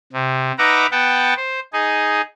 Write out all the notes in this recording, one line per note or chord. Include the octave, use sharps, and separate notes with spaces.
C3
D#4 B4 E5 F#5 A#5 D6
B3 F#5 G5 A5
C5
D#4 G#4